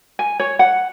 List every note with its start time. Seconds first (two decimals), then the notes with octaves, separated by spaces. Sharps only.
0.19 G#5
0.40 C#5
0.59 F#5